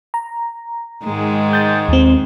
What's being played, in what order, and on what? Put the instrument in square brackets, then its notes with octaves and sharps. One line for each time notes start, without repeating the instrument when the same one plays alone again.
[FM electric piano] A#5
[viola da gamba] G#2 D#3 G#3
[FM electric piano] G6 A6
D#2 C4